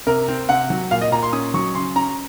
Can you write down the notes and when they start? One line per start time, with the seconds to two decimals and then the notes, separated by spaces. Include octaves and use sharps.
0.07 C3 A#4
0.28 C4
0.49 C3 F#5
0.70 F#3
0.91 A#2 F5
1.02 D#5
1.12 A#2 A#5
1.23 C6
1.33 C#4 D#6
1.54 F#3 C#6
1.75 C#3 C6
1.96 C#4 A#5